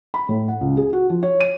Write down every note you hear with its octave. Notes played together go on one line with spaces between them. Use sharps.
B5
A2
F#5
C#2
G#4
F#4
F3
C#5
D#7